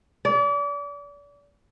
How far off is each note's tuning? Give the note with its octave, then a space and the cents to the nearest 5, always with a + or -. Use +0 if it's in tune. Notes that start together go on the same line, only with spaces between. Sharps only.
D5 -35